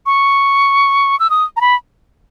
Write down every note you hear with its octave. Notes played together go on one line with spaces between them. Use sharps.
C#6
E6
D#6
A#5
B5